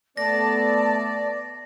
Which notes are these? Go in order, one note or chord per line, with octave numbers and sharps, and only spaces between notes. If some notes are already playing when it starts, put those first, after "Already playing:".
A3 B3 D5 A5 A#6